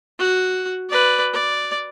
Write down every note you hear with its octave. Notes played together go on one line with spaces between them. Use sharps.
F#4
B4 D5
D5